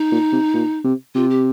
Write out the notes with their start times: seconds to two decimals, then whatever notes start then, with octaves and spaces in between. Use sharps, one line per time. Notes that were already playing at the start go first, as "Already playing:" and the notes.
Already playing: D#4
0.12 A#2
0.32 C3
0.54 A#2
0.84 C3
1.15 C3 F4
1.30 G4